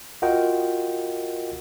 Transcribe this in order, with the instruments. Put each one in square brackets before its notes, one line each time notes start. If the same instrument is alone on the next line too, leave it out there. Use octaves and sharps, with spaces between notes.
[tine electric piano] F4 F#4 A#4 D#5 F#5 G5